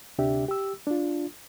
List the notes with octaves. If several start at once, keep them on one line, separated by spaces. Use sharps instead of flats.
D2 C3 D4 G4 E5
G4 E6
D4 F4